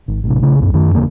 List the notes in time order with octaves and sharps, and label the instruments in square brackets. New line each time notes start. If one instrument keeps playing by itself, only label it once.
[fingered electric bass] G#1
A1 C3
A#1 C#3
C2 F#2
F#2 D#3
D#1 E2 C#3 A#3